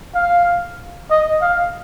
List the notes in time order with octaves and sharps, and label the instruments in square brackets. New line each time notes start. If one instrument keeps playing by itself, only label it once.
[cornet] F5
D#5
F5